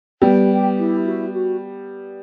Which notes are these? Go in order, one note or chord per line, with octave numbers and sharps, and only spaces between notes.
G3 B3 G5
G4
E4
F#4
F#4